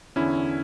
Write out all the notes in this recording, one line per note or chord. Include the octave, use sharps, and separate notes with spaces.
E2 D3 C#4 E4